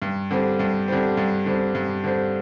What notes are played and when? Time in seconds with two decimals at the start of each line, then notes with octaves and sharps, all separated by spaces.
0.02 G2
0.30 D3 G3 C4
0.59 G2
0.88 D3 G3 C4
1.17 G2
1.46 D3 G3 C4
1.75 G2
2.04 D3 G3 C4